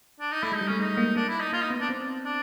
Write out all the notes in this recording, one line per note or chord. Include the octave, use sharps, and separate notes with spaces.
D4
D#4
A3 E4
G#3
D#4
G3
A3 C#4
G#3 D#4
A#3
A#3 D4
E4
D#4
A#3 F4
D#4
B3
D4
C4
D4